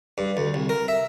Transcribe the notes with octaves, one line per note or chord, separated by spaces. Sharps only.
G2
D2
C2
A#4
E5